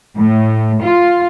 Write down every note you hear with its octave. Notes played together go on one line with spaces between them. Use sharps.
A2
F4